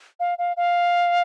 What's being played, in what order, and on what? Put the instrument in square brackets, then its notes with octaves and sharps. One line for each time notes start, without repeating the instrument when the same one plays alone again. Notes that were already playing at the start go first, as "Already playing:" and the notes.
[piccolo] F5
F5
F5